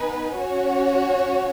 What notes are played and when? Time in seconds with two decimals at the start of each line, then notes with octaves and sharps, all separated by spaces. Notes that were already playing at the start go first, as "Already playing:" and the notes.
Already playing: B3 D#4 B4 G#5
0.39 C#4 F#4 C#5